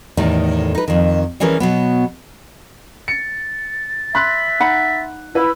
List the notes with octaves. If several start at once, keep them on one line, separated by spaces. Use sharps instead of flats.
E2 A2 D#3 G3 D#4
D#4 B4
F2 D#3
E3 G3 C#4 G#4 A#4 B4
B2 F#3 B3
A6 C#7
E5 B5 C6 F#6
D#4 F#5 B5
E4 B4 E6